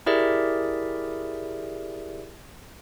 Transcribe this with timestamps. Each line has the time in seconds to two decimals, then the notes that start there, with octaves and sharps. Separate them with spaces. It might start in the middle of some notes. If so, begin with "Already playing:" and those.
0.06 E4 G4 G#4 A#4 D5 E5